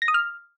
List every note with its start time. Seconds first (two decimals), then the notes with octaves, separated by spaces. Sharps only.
0.02 A#6
0.08 D#6
0.14 F6